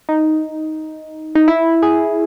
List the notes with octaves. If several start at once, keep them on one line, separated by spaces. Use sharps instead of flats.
D#4
D#4
E4
G#4